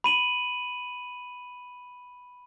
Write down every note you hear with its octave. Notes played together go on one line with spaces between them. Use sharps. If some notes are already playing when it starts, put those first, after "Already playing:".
B5 D#7 F#7